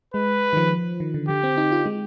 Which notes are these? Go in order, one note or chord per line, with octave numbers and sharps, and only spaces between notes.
G#3 B4
D#3
F3
D#3
D3
D3 G4
C4
D#4
F4
G#3